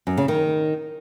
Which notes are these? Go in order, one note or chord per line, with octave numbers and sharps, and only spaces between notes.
F#2
C#3
D#3